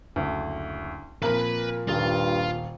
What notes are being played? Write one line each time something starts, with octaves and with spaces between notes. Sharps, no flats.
F#1 D2
A#2 F3 C4 A#4 B4 B5
D#1 G2 F4